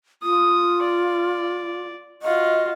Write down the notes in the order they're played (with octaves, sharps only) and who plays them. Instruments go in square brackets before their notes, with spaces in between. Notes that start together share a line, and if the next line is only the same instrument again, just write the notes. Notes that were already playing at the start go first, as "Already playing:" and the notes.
[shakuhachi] F4 [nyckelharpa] D#6
[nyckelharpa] D5
[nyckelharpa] F4 F#4 [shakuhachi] D#5